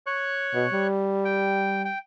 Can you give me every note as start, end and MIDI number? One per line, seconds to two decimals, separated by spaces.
0.07 0.87 73
0.07 0.87 85
0.07 0.87 90
0.54 0.66 47
0.73 1.90 55
1.25 1.82 79
1.85 1.99 79